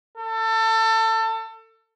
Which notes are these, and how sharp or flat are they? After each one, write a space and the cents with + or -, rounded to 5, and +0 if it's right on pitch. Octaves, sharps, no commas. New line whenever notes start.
A4 +25